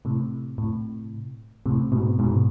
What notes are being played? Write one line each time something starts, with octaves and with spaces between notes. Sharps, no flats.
A2 C3
A2
A2 C3
G#2 B2
G#2 B2